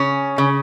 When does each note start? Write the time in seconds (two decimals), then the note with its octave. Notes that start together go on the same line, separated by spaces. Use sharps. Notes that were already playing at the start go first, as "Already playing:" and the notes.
Already playing: C#3 C#4
0.38 C#3